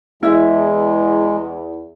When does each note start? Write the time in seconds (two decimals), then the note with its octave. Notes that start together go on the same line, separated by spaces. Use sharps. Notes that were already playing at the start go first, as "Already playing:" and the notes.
0.23 E2 G#3 E4 E5